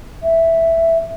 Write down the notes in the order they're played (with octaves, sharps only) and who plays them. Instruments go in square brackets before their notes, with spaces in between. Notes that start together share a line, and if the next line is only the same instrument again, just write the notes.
[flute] E5